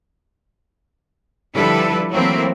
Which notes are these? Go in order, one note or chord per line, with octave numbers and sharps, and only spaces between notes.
D3 F3 G3 E4 A4 B4
E3 F#3 A3 A#3 C4 E4